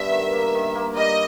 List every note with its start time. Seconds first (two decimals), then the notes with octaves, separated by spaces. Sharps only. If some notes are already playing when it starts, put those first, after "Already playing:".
Already playing: G2 B3 E5
0.12 D#3
0.33 A#3
0.55 D#3
0.75 A#3
0.96 G3 D#5